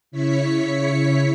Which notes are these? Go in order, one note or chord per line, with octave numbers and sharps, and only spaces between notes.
C#3 E4 C#5 B6 C#7